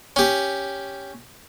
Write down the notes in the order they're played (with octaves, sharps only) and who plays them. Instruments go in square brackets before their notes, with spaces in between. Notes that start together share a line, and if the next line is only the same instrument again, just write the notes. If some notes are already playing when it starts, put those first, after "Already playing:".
[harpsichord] C#4 G4